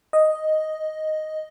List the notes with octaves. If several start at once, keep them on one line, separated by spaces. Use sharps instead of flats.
D#5